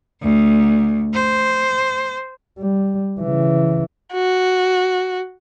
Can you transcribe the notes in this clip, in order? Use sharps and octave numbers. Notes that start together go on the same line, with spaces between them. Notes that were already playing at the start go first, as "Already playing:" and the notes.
D2
C5
G3
C#3 E3
F#4